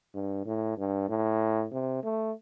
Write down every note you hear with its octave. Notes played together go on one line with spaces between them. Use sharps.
G2
A2
G2
A2
C3
A3